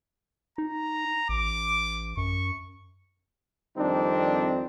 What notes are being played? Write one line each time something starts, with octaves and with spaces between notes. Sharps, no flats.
D#4 A#5
A1 D6
F#2 C#6
F2 D#3 G3 C4 D4 D#4